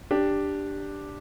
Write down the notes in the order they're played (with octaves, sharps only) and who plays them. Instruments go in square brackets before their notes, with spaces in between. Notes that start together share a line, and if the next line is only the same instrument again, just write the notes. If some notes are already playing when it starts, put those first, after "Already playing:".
[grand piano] D4 G4